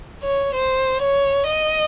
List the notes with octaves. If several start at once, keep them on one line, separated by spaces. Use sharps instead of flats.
C#5
C5
C#5
D#5